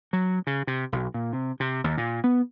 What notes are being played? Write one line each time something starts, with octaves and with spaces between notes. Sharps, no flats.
F#3
C#3
C3
B1
A#2
C3
C3
D#2
A#2
B3